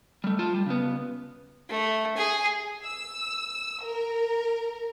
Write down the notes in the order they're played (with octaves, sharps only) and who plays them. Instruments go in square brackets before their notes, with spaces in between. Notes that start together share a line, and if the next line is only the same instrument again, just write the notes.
[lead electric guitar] G3 A3
F4 A5
G3
C#3 B3
[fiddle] A3
G#4
[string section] E6
A#4